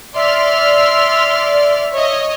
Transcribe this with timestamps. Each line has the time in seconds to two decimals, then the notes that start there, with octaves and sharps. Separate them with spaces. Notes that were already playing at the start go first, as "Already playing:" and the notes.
0.15 D5 E5 C6 F6
1.92 C#5 D#5